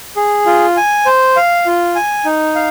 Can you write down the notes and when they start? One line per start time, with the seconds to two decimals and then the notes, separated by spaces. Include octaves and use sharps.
0.16 G#4
0.46 F4
0.77 G#5
1.06 C5
1.36 F5
1.66 F4
1.95 G#5
2.25 D#4
2.55 F5